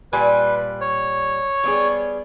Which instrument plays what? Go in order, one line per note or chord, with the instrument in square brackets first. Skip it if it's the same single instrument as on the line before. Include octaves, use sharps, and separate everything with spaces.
[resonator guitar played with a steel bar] A#2 G3 G#5 [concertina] B4
[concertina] C#5
[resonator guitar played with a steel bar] G3 B3 G#4